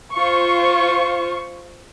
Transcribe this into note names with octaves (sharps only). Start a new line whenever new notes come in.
F4 C5 C#6